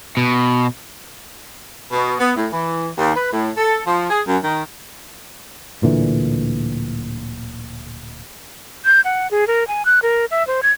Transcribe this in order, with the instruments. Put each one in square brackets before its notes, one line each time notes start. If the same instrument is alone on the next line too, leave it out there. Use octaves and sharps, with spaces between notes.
[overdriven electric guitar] B2
[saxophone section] B2
B3
A2
E3
D#2
B4
A2
A4
F3
G#4
F#2
D#3
[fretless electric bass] D1 A#2 D3 E3
[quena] G6
F#5
G#4
A#4
G#5
F#6
A#4
E5
C5
G#6